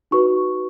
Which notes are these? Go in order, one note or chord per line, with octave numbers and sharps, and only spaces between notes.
D#4 F#4 B4 C#6